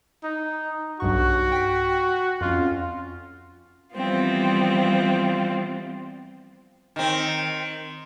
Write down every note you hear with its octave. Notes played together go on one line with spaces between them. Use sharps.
D#4
B1 G2 F#4 C#6
G5 B6
F2 C#4 F4
E3 F3 G3 B3 C4 F4
D#3 C4